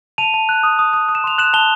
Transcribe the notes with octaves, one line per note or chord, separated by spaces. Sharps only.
A5 D#7 F7
A5
F#6
D#6
D#6
D#6
D#6
E7
C6 F7
F#6 E7 F#7
A5 F7 G7